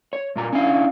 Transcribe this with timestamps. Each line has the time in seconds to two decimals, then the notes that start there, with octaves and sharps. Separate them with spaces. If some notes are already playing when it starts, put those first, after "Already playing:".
0.13 C#5
0.36 G2 A#2 A#5
0.52 C#4 D4 E4 F5